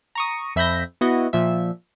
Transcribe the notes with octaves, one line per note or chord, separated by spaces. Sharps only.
A#5 C#6 D#6
F2 E5 B5 G6 A#6
B3 E4 F#4 D#5
A#2 F3 E5